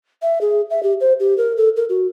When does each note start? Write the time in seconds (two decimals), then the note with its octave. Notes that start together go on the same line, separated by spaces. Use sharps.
0.22 E5
0.41 G#4
0.70 E5
0.83 G4
1.00 C5
1.20 G4
1.38 A#4
1.57 A4
1.76 A#4
1.89 F#4